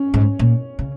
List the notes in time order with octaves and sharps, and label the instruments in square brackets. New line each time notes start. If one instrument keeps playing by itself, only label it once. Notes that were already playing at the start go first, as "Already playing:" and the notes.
Already playing: [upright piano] C#4
[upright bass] G#2
A#2
C#3